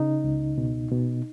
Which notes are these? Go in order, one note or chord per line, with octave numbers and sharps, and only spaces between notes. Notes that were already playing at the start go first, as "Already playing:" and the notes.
Already playing: C#3 D#4
C#2
B2
B2